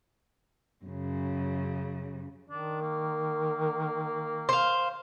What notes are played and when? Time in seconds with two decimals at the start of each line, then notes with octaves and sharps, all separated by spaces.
0.85 F#2 C#3
2.50 D#3 D4
2.81 A#3
4.49 C5 F5